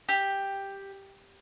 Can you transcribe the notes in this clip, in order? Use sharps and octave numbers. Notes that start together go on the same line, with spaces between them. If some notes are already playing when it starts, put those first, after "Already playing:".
G4